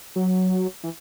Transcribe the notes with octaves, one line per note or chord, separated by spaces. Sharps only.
F#3
E3